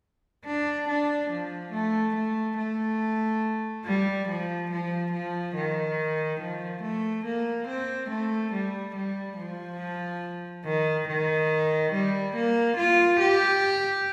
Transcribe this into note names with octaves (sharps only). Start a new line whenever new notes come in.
D4
D4
F3
A3
A3
A3
G3
F3
F3
F3
D#3
F3
A3
A#3
C4
A3
G3
G3
F3
D#3
D#3
G3
A#3
F4
G4